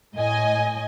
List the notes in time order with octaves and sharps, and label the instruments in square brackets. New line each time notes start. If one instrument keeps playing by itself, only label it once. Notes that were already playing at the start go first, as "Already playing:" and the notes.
[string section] A2 D#5 G#5